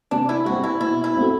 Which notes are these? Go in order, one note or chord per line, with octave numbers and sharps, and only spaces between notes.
C3 D4
E4
G3 C4 F#4
E4
B2 E4
E4
A3 C4 F#4 A4